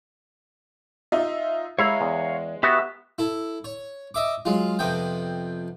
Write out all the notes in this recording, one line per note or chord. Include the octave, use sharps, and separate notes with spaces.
D#4 F4 E5
G#3 E4 C#5 F5 A#5
E2
B3 F#4 G4 E5
E4 A4
C#5
D#5 E5 D6
F#3 G#3 F4
F2 C3 B3 G5